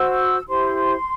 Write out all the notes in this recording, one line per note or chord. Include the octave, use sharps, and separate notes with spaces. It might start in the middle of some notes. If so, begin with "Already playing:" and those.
Already playing: F#4 C5 E6
E4 G4 C5 C6